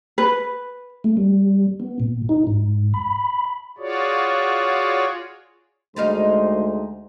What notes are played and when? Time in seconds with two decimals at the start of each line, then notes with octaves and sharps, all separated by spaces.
0.18 B4
1.04 A3
1.17 G3
1.80 B3
2.00 A#2
2.29 D#4
2.47 G#2
2.94 B5
3.78 F4 F#4 G#4 C#5 D5
5.96 D2 G3 G#3 D#4 C5 F5